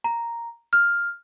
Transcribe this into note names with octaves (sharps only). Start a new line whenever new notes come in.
A#5
F6